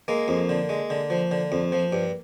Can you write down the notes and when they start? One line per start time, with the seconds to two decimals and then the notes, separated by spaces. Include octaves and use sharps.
0.08 G#3 A#3
0.28 F2
0.49 D3
0.69 G#3
0.90 D3
1.10 F3
1.31 D3
1.52 F2
1.72 F3
1.93 G2